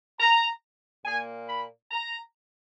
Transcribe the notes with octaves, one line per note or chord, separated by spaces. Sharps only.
A#5
A#2 A#3 G#5
B5
A#5